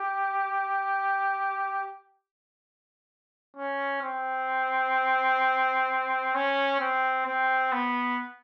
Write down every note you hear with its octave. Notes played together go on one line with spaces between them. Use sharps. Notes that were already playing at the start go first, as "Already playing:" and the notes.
Already playing: G4
C#4
C4
C#4
C4
C4
B3